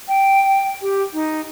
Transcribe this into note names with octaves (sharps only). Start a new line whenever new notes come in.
G5
G4
D#4